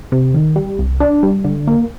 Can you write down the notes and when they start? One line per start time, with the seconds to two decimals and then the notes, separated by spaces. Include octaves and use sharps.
0.12 C3
0.34 D#3
0.56 G3
0.79 C2
1.00 D4
1.23 G3
1.45 D3
1.67 A#3